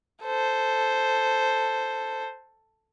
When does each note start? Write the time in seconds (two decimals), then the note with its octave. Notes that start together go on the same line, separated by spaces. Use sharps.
0.23 A4 C5